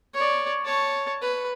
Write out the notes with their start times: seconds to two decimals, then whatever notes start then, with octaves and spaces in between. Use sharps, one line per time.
0.14 C#5 D5
0.65 C#5 A5
1.22 B4